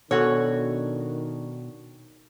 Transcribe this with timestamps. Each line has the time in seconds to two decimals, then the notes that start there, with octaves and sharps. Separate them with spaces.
0.11 B2 D#3 D4 F#4 A4 C#5 G#5